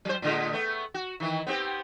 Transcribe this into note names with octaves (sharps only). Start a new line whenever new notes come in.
F#3 C5
A2 D3 G#3
A3 B3
F#4
D#3 E3
B3 C4 G4